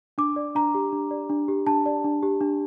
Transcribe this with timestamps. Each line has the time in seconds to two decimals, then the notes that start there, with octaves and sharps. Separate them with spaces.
0.18 D4 D6
0.36 D5
0.55 D4 A#5
0.75 G4
0.92 D4
1.11 D5
1.29 D4
1.48 G4
1.67 D4 A5
1.86 D5
2.04 D4
2.23 G4
2.41 D4